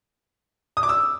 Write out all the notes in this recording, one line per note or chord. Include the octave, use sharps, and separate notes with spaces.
D#6
D6
E6